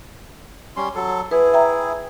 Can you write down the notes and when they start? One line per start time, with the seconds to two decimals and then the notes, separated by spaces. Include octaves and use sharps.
0.76 G3 C#4 C6
0.95 F#3 A4
1.31 E4 G#4 B4
1.53 E5 G5 A#5